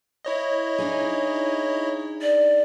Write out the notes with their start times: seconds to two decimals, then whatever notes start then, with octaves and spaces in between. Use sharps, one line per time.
0.25 E4 C#5 D#5
0.78 D4 D#4 G#4
2.22 D5